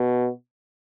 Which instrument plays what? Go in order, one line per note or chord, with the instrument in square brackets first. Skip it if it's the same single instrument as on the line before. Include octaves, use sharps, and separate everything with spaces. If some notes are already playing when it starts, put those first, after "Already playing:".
Already playing: [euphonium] B2